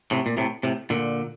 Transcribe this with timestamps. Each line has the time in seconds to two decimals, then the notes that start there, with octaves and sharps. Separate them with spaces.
0.11 A2 C3
0.26 A#2
0.37 A2 C3
0.63 A2 C3
0.90 A#2 D3